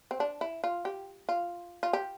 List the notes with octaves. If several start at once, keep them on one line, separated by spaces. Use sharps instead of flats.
C4
D4
E4
F4
G4
F4
F4
G4